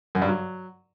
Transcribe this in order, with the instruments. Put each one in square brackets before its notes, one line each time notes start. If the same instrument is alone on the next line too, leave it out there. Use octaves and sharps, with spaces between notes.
[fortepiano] F#2
G2
F#3